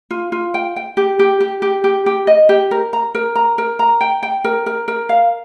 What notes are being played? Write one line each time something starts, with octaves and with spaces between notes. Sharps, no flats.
F4
F4
G5
G5
G4
G4
G4
G4
G4
G4
D#5
G4
A#4
A#5
A#4
A#5
A#4
A#5
G5
G5
A#4
A#4
A#4
F5